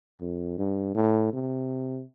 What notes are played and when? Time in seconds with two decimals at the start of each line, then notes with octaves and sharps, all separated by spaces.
0.21 F2
0.59 G2
0.95 A2
1.33 C3